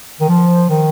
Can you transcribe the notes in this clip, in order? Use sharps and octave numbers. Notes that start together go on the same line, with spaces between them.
D#3
F3
D#3